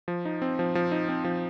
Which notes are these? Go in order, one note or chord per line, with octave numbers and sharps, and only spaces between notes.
F3
D#4
C4
F3
F3
D#4
C4
F3